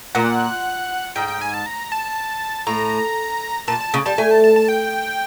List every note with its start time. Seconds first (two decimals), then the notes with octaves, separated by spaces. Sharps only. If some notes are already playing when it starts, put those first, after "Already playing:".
0.15 A#2 F#5
1.16 G#2 G5
1.28 G5
1.41 G#5
1.54 A5
1.66 A#5
1.92 A5
2.67 A2 A#5
3.68 A#2 A5
3.81 A5
3.94 C#3
4.06 G3 A5
4.18 A3 G#5
4.31 A5
4.44 A5
4.56 A5
4.69 G5